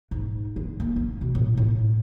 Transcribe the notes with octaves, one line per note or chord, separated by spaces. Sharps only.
G#2
D3
A#3
C#4
B2
A2
A2